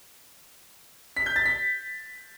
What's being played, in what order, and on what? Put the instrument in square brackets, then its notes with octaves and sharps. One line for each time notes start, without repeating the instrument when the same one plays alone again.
[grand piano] B6
G6
A6
B6